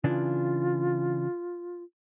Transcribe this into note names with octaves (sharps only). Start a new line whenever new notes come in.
C#3 E3 D4 F4